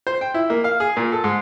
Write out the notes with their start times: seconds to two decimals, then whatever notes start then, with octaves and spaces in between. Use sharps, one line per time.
0.07 C5
0.21 G5
0.34 E4
0.50 A#3
0.64 F5
0.80 G#4
0.97 A#2
1.12 A4
1.24 G#2